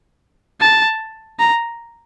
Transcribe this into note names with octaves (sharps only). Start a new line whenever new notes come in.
A5
A#5